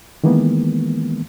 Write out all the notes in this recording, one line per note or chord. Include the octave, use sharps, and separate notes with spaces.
D#3 E3 G#3 A#3 B3